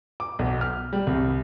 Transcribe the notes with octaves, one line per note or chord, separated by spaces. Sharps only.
D6
B1
F6
G3
C2